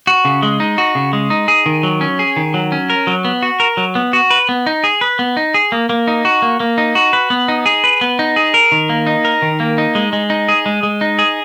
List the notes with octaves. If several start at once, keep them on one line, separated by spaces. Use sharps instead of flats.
F#4
C#3
G#3
D#4
F#4
C#3
G#3
D#4
G#4
D#3
F#3
C#4
G#4
D#3
F#3
C#4
A#4
F#3
B3
F#4
A#4
F#3
B3
F#4
B4
B3
D#4
G#4
B4
B3
D#4
G#4
A#3
A#3
D#4
F#4
A#3
A#3
D#4
F#4
B4
B3
D#4
G#4
B4
B3
D#4
G#4
A#4
D#3
A#3
D#4
A#4
D#3
A#3
D#4
G#3
G#3
D#4
G#4
G#3
G#3
D#4
G#4